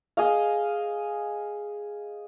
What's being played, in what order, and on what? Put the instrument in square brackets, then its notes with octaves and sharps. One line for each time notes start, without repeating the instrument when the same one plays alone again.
[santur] G#4 D#5 F5